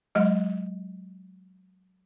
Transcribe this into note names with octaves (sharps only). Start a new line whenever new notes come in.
F#3 G#3 D#5